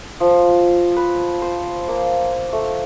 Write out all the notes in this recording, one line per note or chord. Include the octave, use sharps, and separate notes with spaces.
F3
B4
C5
A#3
A3